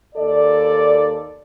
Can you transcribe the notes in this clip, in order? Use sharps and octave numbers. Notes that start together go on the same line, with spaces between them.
D#2 A4 D5